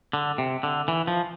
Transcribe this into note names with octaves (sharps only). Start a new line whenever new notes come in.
D3
C3
D3
E3
F3